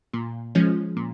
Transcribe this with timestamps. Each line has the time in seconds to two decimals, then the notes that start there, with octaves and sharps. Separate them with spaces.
0.13 A#2
0.55 F3 G#3 C#4
0.97 A#2